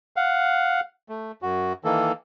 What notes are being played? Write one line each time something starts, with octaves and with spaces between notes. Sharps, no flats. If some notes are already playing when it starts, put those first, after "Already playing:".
F5 F#5
A3
F#2 F#4
D#3 E3 A#3 A4